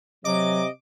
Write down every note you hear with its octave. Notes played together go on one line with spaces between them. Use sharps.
C3 F#3 D#5 D6